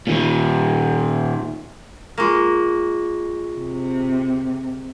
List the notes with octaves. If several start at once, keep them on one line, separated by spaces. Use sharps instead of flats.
A#2 D#3
G#3 A#3 F4 C#6 A#6
C3